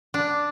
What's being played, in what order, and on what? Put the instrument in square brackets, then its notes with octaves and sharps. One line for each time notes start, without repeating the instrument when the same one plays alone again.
[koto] D4